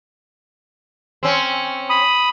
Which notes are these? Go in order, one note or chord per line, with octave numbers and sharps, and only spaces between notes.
C4 C#4
B5 D#6